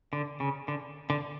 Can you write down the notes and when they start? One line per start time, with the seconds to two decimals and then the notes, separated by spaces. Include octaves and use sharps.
0.13 D3
0.40 C#3
0.68 D3
1.10 D3